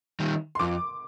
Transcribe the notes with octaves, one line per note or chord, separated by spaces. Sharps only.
D#3 G3
C6
F2 D6